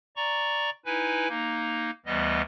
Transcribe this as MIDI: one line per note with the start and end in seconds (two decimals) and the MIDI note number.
0.16 0.70 74
0.16 0.70 82
0.16 0.70 85
0.85 1.28 63
0.85 1.28 64
0.85 1.28 71
0.85 1.28 80
1.29 1.91 58
1.29 1.91 63
2.06 2.42 38
2.06 2.42 52
2.06 2.42 55
2.06 2.42 59
2.06 2.42 75